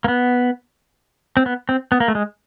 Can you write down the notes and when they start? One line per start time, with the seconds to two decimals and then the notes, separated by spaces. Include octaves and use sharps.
0.04 A#3
0.08 B3
1.37 C4
1.46 B3
1.69 C4
1.92 B3
2.00 A#3
2.08 A3
2.15 G#3